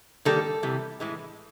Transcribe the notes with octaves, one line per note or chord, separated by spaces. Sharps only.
D#3 G3 A#3 A4
C3 E3 G3
A2 E3 G#3